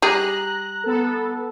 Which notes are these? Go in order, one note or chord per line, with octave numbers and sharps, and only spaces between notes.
G3 G#4 A#5 F#6
B3 A4